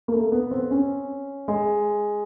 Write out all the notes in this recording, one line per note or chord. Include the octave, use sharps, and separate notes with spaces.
A#3
A3
B3
C4
C#4
G#3